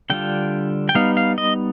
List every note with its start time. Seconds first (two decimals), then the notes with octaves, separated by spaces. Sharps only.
0.10 D3 G3 D4 F4 G5
0.89 G5
0.95 G3 B3 D#4 F5
1.17 F5
1.38 D#5